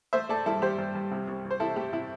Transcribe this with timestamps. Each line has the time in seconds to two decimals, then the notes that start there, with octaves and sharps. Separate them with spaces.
0.13 A3 C5 E5
0.29 A3 A4 D5
0.46 G2 E4 A4
0.62 G2 G4 C5
0.78 G2
0.95 G2
1.11 C3
1.28 C2
1.45 C2
1.51 C5
1.60 C3 E4 A4
1.76 A3 G4
1.93 C3 E4